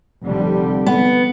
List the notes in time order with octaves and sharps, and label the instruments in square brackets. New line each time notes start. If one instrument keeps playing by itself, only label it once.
[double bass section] F1 D3 G3
[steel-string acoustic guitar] B3